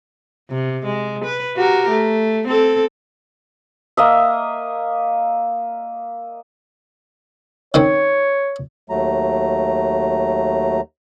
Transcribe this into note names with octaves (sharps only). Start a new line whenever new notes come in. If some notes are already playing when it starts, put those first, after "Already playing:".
C3
G#3
B4
F#4 G4 A#4
A3
C4 A4
A#3 D#5 E5
D#3 C4 C#4 C#5
D#2 F#3 A3 A#5